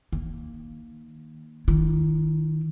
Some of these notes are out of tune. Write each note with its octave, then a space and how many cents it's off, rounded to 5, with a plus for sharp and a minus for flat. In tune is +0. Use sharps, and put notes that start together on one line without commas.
D#3 +0 A#3 +0
D#3 +5 E4 +45